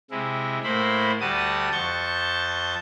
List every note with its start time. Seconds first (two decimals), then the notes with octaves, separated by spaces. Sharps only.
0.11 C3 G#3 E4
0.64 A2 A#3 E4 C5 B5
1.20 D2 G3 F#4 A5 D#6
1.72 F2 A5 C#6 G6